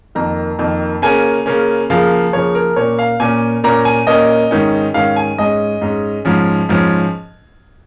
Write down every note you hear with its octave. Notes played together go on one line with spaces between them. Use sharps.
F2 D#3 A#3 A#5
F2 D#3 A#3
C#3 A#3 C#4 G#5
C#3 A#3 C#4
C#3 F3 A#3 F5
C#3 F3 A#3 C#5
A#4
A#2 A#3 C#4 C#5
F5
A#2 A#3 C#4 G#5
A#2 A#3 C#4 A#5
G#5
A#2 A#3 C#4 D#5
G#2 D#3 C#4
G#2 D#3 C#4 F5
G#5
G#2 G#3 C#4 D#5
G#2 G#3 C#4
G#2 F3 C#4
G#2 F3 C#4